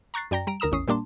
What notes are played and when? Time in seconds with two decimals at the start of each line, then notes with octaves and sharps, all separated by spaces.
0.14 A#5 C#6 F#6 A6 C7
0.31 F#2 D5 G5 A#5 A#6
0.47 G3 A#5 D7
0.60 D2 A#4 A#5 D#6 E7
0.72 A1 E2 C#4 D#6 C7
0.88 A#2 G3 A#3 D4 A5 C6